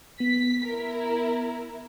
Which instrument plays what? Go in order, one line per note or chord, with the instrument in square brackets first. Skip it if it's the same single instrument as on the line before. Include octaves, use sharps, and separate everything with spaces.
[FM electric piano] B3 [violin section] B6
[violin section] E4 A#4